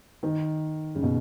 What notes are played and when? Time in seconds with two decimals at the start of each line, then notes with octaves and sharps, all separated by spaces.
0.23 D#3
0.95 C#3
1.03 B2